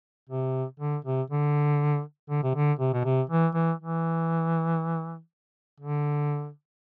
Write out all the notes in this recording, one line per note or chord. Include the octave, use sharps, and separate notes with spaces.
C3
D3
C3
D3
D3
C3
D3
C3
B2
C3
E3
E3
E3
D3